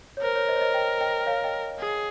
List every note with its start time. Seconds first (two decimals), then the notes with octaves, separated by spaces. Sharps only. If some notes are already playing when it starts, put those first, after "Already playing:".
0.17 C#5
0.22 A#4 C5
0.35 C#5
0.48 C5 D#5
0.56 C#5
0.61 C5 D#5
0.74 D#5 G5
1.00 D#5 G5
1.20 G5
1.27 C#5 F5
1.44 D#5 G5
1.79 G#4